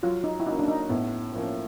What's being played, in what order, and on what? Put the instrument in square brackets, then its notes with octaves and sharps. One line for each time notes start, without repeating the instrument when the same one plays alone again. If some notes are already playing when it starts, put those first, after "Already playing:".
[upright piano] F#3 [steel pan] F4
[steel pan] D#4
E4
[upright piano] A#3 C#4 F#4 [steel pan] D#4
[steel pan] D4
D#4
[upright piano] A2 [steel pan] B3
[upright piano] F3 A#3 C#4